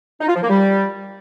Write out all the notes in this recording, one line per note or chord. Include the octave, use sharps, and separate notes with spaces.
D#4
F4
F3
A#3
G3